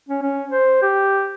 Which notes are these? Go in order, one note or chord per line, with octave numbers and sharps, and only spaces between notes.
C#4
C#4
C5
G4